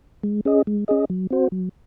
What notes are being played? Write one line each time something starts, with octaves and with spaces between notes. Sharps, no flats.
G#3
C#4 G#4 D#5
G#3
C#4 G#4 D#5
F#3
C4 F#4 C5
F#3